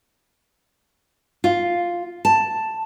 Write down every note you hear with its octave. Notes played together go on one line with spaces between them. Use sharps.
F4
A5